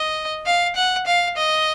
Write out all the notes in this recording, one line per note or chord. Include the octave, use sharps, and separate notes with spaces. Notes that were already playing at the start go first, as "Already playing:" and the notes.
Already playing: D#5
F5
F#5
F5
D#5